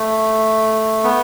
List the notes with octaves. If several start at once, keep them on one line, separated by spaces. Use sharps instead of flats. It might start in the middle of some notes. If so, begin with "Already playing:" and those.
Already playing: A3
B3